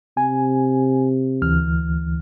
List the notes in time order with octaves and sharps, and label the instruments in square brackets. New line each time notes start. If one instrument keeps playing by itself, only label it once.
[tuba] C3 [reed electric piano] G#5
[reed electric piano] D2 E3 F6